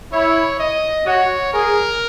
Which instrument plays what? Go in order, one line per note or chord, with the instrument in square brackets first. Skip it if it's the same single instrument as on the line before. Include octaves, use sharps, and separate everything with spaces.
[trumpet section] E4 [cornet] C#5
[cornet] D#5
[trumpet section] F#4 [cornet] C#5
[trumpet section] G#4 [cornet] A#4